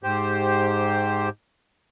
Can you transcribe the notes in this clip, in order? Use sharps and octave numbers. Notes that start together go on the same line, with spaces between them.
G#2 G4 C5